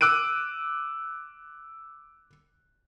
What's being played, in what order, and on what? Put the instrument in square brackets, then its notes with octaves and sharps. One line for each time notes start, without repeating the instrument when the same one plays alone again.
[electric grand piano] D6 E6 F#6 D7 D#7